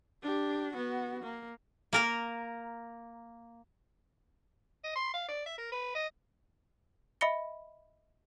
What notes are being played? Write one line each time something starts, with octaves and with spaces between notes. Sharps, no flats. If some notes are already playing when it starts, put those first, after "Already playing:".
D4 G4
B3 F#4
A#3
A#3 A#4 A#5
D#5
C6
F5
D5
E5
A#4
B4
D#5
D#5 E5 B5 A#6 C#7 G7